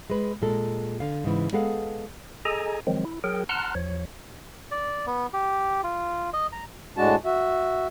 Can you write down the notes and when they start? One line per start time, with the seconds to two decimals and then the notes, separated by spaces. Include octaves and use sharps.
0.10 G#3 B4
0.42 A#2 G#3 A4
1.00 D3 F5
1.24 G#2 C#3 E3
1.52 G#3 B3 G#4 A4 F5 F#5
2.45 G#4 A4 D#5 G#5 A#5
2.87 D#3 F3 F#3 G#3 C4
3.05 E4
3.24 F#3 G#4 A#4 G5
3.49 F#5 A5 A#5 C6 F6 F#6
3.75 E2 F3 C#5
4.71 D5
5.06 B3
5.33 G4
5.84 F4
6.33 D#5
6.53 A#5
6.97 A2 G#3 D4 F#4 A5
7.25 F#4 E5